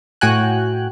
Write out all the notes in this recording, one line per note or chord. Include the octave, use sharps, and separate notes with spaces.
A2 F#4 G5 G#5 F#6